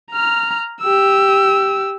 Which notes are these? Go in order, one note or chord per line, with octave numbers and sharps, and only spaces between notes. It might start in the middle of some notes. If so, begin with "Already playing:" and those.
A#5 F6
G4 E6